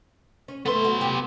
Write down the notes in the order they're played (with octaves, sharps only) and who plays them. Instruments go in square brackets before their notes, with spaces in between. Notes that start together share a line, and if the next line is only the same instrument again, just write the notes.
[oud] C#4
[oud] A3 B4 [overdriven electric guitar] B3 C6
[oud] F#4
G4